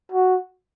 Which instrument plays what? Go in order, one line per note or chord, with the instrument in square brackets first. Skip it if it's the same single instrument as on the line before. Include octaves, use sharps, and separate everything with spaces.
[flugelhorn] F#4